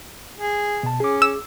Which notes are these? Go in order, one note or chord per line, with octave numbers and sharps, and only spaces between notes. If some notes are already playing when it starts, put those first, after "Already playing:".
G#4
B2 A5
C#4 G#4 D6
E6